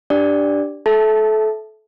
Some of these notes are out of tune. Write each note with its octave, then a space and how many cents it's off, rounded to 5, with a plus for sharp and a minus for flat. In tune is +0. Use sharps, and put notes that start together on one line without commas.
D4 +0 G4 +0 D5 +0
A4 -25 E5 -5 A5 +0